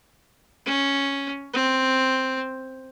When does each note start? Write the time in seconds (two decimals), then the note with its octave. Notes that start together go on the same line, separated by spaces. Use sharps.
0.66 C#4
1.53 C4